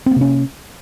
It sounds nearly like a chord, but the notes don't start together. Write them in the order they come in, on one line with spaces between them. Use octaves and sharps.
C4 A#3 C3 C#4